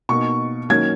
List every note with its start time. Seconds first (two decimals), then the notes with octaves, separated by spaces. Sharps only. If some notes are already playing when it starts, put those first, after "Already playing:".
0.09 B2 A#3 D#4 C#6
0.69 D#3 F#3 A#3 C#4 G#6